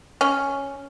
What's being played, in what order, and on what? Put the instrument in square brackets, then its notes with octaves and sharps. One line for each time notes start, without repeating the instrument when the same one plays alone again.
[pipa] C#4